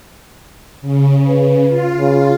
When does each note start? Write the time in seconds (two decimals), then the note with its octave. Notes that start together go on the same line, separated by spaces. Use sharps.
0.81 C#3
1.28 B4
1.68 F4
1.98 C#3